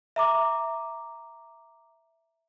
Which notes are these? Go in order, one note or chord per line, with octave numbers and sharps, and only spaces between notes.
E5 A#5 D6